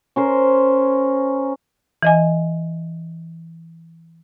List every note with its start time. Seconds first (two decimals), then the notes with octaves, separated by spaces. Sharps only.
0.16 C#4 A#4 C5
2.03 E3 D#5 G#5